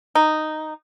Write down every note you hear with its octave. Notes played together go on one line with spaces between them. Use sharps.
D#4